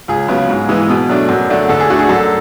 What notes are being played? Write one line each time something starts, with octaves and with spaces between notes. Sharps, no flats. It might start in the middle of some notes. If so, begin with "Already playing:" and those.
C#2 G#4
C#3 F#3 B3
G#2
E3 G#3 B3
B2
F#3 A3 D4
F#2
D3 A3 D4
D2 A4
G#4
D3 A3 F#4
G#4
F#2 A4